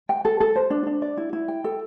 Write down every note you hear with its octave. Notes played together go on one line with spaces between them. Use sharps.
G5
A4
A4
C5
D4
D4
D5
E4
E4
G5
A4